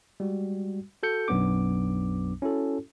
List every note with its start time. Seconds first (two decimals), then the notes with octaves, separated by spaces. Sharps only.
0.20 G3 G#3 F#4
1.03 F#4 A4 G6 C#7
1.28 B1 F#2 F#3 B3 D4 D6
2.42 C#4 E4 F#4 A4